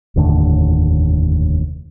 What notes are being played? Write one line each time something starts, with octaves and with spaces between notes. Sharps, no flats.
F1 D#2 A2 D3